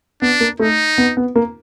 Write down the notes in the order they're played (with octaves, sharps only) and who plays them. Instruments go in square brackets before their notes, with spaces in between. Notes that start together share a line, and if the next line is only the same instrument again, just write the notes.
[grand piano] B3 [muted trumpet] D4
[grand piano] A#3
[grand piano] A3 [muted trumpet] D#4
[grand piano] B3
B3
A#3